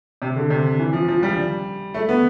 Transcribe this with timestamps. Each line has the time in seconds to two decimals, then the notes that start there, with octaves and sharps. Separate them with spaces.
0.22 C3
0.36 D3
0.50 C3
0.79 E3
0.93 F3
1.08 F3
1.23 G3
1.94 A3
2.09 B3